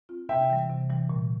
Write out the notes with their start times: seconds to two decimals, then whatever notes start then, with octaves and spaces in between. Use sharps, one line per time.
0.09 C4 F4
0.29 C3 E5 G5
0.50 E3 G3
0.70 C3
0.90 E3 G3
1.09 A#2